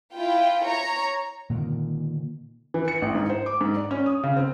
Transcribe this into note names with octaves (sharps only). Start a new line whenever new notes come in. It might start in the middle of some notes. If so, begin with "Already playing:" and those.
E4 F4 G5
C#5 A#5
A#2 D3 D#3
E3
C#7
A1
G#2
C5
D6
G#2
D5
C#4
D#6
C#3
C4